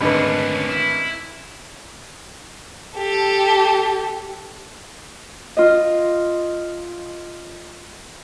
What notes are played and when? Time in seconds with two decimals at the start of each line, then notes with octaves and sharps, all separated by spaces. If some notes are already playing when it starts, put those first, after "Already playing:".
0.01 G#1 D2 C#4 D4 B4
0.69 E4
2.97 G4 A4
5.57 F4 D#5